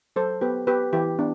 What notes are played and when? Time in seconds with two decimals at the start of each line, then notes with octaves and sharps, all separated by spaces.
0.16 F#3 A4 C5
0.41 B3 G4 B4
0.67 B3 G4 B4
0.93 E3 E4 G4
1.19 B3 D4